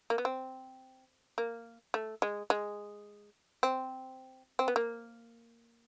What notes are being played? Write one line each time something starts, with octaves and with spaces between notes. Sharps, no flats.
A#3
B3
C4
A#3
A3
G#3
G#3
C4
C4
B3
A#3